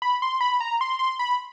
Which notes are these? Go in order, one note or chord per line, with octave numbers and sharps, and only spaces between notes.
B5
C6
B5
A#5
C6
C6
B5